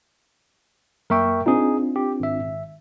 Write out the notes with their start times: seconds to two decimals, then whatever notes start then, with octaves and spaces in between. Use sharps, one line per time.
1.10 F#2 A#3 A#4 E5 G5 C#6
1.46 C4 D4 D#4 F4 G#4
1.96 G4
2.20 G#1 E5